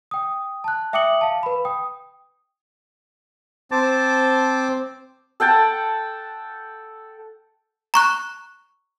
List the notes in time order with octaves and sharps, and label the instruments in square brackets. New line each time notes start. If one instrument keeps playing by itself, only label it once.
[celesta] G5 D#6
A5 F#6
E5 G5 D6 D#6 C#7 F#7
F5 A5
B4 B5
G5 D#6
[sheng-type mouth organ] C4 [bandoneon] C5 D6 [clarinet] A5
[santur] A4 F#5 G5 A5
[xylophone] A#5 C#6 F#6